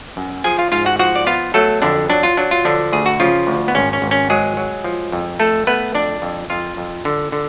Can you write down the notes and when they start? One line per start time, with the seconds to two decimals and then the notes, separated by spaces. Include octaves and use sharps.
0.17 F#2
0.44 F3 G#4 G#5
0.58 F4 F5
0.72 G#2 F4 F5
0.86 F#4 F#5
0.99 F3 F#4 F#5
1.16 D5
1.27 B3 F4 F5
1.54 F#3 A3 A4
1.82 F2 D3 D4
2.10 F#3 D4
2.23 F4
2.37 F#3 D4
2.51 F4
2.65 D3 F3 D4
2.92 D2 G#4
3.06 F#4
3.20 C#3 F3 F4
3.47 D2
3.68 B3
3.75 G#1 C#4
3.93 C#4
4.02 G#1
4.11 C#4
4.30 F#3 G#3 G#4
4.57 F#3
4.84 F3
5.12 F2
5.40 A3 A4
5.67 A3 B3 B4
5.95 F2 D4 D5
6.22 F2
6.50 F2 F4 F5
6.77 F2
7.05 D3
7.32 D3